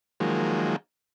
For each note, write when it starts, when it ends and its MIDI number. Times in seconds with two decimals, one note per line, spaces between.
0.20 0.76 51
0.20 0.76 53
0.20 0.76 54
0.20 0.76 56
0.20 0.76 58